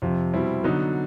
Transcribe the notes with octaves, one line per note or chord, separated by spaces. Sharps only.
F2 C3 F3
B2 G3 C4 E4
D3 F#3 B3 D#4